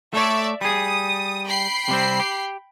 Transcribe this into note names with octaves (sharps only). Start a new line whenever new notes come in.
A3 A4 C#5 D5 E5
G3 G#4 D#6
G5 B5 C7
C3 G3 C4
G4